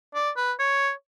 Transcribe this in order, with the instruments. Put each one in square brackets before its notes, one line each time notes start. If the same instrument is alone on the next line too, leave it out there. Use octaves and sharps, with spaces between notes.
[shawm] D5
B4
C#5